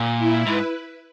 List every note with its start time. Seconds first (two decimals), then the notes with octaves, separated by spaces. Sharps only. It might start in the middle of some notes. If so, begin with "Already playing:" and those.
Already playing: A#2
0.18 E4
0.47 G#2 B4